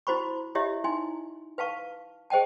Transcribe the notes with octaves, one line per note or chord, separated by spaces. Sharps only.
E4 F#4 C5 B5 C#6
E4 F4 G4 C#5 D#5 E5
D#4 E4 G#5 C6
B4 F5 A5 C#6
G#4 C5 D#5 G5 A5